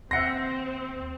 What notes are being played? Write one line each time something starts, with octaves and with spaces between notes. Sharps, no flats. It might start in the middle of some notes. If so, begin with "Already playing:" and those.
D#2 C4 E5 F#5 C6 A#6 C#7